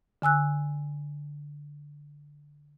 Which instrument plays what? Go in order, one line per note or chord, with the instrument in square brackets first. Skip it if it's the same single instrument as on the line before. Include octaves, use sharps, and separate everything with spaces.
[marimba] D3 G#5 E6 F#6